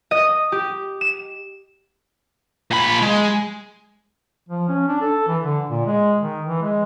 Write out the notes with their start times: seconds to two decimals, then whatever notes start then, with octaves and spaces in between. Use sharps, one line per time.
0.11 D#5
0.52 G4
1.01 E7
2.71 A#2 B5
3.02 G#3
4.49 F3
4.69 C#4
4.88 D4
5.01 A4
5.28 E3
5.43 D3
5.69 A#2
5.86 G#3
6.20 D#3
6.46 E3
6.62 G#3